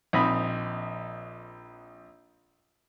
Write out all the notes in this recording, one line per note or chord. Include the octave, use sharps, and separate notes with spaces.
A#1 C4 D#4 D#5 B5